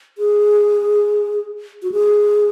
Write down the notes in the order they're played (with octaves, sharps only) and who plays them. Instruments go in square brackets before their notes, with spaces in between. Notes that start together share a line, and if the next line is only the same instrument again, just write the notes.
[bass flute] G#4
F#4
G#4